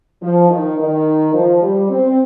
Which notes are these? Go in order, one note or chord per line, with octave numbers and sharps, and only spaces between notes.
F3
D#3
D#3
F3
G3
C4